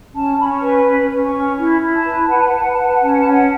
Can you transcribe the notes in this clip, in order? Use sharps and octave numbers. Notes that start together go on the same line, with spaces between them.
C#4 A5
C#4 B5
C#6
B4
C#4
C#4
C#6
C#4
E4
E4
A5
B4
B4 F#5
A5
F#5
B4 A5
F#5
A5
B4 F#5
A5
F#5
C#4 A5
F#5
A5
C#4 F#5